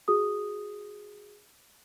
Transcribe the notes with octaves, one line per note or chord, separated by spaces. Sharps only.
F#4 G#4 D#6